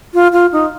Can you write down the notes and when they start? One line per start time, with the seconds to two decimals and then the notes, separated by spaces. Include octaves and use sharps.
0.14 F4
0.33 F4
0.53 D#4